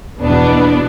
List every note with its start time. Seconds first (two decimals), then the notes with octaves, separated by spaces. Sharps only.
0.22 E2 B2 B3 D4